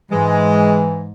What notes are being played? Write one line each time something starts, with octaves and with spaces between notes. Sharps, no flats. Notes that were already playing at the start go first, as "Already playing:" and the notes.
G#2 E3 G#3